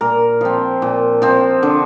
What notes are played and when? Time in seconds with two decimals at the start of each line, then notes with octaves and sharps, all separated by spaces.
0.01 A#2 A#4
0.41 F3 C4
0.82 A#2
1.22 F3 C4
1.63 D3